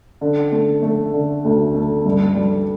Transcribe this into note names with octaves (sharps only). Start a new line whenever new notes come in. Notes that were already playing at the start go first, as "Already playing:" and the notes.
D3
A3
A3
D3
D2
A3
G2
G3